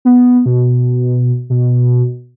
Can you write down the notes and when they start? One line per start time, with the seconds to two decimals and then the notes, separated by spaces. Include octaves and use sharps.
0.05 B3
0.46 B2
1.50 B2